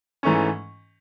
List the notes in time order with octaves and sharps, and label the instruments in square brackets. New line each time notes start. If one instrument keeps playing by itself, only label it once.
[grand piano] G#2 E3 A3 C#4 C#6